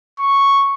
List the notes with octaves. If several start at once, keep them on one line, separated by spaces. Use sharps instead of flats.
C#6